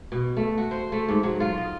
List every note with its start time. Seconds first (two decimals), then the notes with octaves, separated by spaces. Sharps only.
0.12 B2
0.37 A3
0.58 F#4
0.71 C5
0.92 A3
1.09 G#2
1.23 F#3
1.40 F4
1.58 D#5